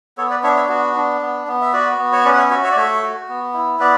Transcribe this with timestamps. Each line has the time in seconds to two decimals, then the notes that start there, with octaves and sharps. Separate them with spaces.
0.18 B3 A4 C#5
0.30 B4 D5
0.43 D4 C#5 E5
0.56 C#5 E5
0.69 B3 F#4
0.96 D4
1.21 B3
1.47 B3
1.61 E5
1.73 F#4 B4 D5
1.98 B3
2.13 C#5
2.25 C#4 B4 D5
2.33 F#5
2.37 C#5 E5
2.50 F#4 C#5 E5
2.64 C#5 E5
2.71 D5
2.76 A3 C#5 E5
3.03 F#4
3.29 B3
3.54 E4
3.79 B3 B4 D5